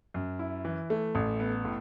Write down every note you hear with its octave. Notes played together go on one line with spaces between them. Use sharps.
F#2
E4
E3
A3
A1
B3
A2